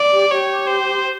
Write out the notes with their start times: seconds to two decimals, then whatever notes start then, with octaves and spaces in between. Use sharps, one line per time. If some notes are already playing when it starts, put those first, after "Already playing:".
Already playing: D5
0.12 G4
0.31 G4 C#5
0.67 C5